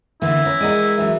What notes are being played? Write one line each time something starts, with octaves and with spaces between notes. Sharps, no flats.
D3 E3 A#3 E4 A4
C#4 B4 A#5
G#3 A#4 D5 D#5 F#5
F#2 E3